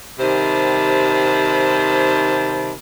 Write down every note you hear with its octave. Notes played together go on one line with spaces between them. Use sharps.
C3 D#3 G3 C5 A5 B5